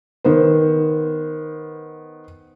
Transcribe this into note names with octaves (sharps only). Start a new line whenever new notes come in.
D#3 B3 C5